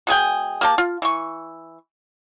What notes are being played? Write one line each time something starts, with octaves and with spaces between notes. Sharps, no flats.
B2 G#3 G#4 G5
A#3 G4 A5
F4
E3 C#6